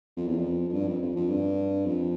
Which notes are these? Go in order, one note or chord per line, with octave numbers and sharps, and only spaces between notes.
F2
E2
F2
F2
G2
F2
F2
F2
G2
F2